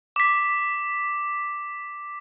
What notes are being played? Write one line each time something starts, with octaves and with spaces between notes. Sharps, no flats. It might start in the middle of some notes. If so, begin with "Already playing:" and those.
D6 B6